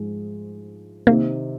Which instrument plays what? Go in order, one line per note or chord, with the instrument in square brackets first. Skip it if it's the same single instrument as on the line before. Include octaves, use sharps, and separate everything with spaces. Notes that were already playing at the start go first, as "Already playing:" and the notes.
Already playing: [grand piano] G#2 F3 G#3
[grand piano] C3 D#3 C4 D#4 [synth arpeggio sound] A#3